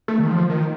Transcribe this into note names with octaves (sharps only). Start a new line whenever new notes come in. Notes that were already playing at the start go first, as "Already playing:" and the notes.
A3
D#3
F3
D#3